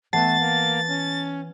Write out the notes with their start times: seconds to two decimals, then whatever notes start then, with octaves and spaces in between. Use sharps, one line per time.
0.13 E3 A3 B3 F#5 A5 A6 C7
0.40 A#3
0.88 C#4